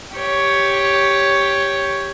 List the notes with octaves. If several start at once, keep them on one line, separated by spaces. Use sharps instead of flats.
G4 C#5